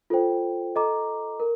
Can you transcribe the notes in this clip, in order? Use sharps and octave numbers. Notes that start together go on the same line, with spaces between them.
F4 A4 C5 G5
A4 D#5 A#5 D6
A#4